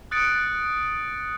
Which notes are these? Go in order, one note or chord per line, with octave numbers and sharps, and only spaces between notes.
D#6 F#6 A6 C#7 D7